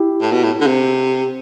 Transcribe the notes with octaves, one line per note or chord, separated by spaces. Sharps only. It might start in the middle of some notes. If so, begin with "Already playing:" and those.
Already playing: E4 G4
A2
B2
A2
D3
C3